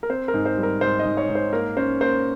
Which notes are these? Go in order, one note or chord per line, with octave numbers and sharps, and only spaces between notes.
A#4
C4 C5
A#4
G#2
C5
G3
A#4
G#2 C5
D#5
G#2
C#5
G#2
C5
A#3 A#4
C#4 C5
A#3 C5